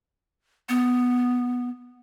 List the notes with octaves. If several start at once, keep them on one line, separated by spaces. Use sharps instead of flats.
B3